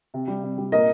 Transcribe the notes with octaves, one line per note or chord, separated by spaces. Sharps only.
C3
G3
C3
G3
A#2 A#4 D#5